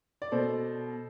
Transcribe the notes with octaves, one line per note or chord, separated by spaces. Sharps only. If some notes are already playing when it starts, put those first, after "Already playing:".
D5
B2 A4 C5